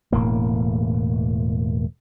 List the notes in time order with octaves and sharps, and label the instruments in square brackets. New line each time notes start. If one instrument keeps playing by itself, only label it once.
[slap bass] E1 A2 A#3